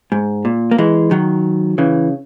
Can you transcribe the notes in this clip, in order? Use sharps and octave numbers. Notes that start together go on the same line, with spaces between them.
G#2
A#2
A#3
E3 G#3
D#3 F#3
C#3 E3